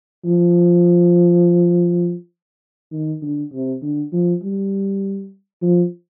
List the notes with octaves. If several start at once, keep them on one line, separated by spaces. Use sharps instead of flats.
F3
D#3
D3
C3
D3
F3
G3
F3